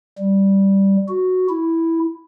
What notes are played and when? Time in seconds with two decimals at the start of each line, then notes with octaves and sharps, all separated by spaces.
0.18 G3
1.09 F#4
1.50 E4